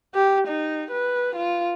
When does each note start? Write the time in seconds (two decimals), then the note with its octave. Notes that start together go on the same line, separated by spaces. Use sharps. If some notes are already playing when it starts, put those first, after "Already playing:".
0.15 G4
0.48 D#4
0.91 B4
1.35 F4